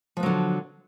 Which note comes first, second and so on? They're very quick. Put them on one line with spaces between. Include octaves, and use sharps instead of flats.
F3 B3 F#3 D3